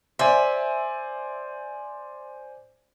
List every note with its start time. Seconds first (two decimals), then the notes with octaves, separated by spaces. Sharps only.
0.19 C5 D5 E5 G#5